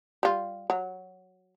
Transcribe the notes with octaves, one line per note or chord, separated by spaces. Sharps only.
G3 F4
F#3